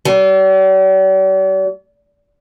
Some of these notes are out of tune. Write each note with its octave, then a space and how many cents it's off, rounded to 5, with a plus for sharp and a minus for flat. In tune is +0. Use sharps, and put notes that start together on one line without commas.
G3 -45